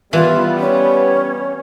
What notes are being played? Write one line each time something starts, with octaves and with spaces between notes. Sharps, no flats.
E3 G3 B3 F4
C#4